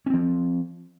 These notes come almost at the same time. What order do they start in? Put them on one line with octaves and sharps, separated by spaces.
C#4 C4 F3